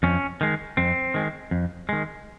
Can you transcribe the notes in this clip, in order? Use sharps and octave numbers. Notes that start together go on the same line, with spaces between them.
F2 C#4
D#3 G#3
F2 C4
D#3 G#3
F2
D#3 G#3